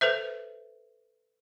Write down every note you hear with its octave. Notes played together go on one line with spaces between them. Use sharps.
A4 B4 C5 E5